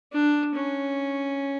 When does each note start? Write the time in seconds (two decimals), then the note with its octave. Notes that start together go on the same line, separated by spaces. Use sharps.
0.13 D4
0.55 C#4